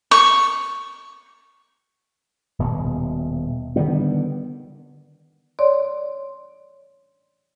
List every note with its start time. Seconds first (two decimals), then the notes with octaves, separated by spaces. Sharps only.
0.11 C#6
2.59 D#1 B2
3.76 D3 D#3 G3 B3
5.59 C#5 D5 C6